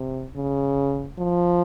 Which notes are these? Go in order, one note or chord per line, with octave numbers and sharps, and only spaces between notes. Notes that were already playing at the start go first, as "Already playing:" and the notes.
Already playing: C3
C#3
F3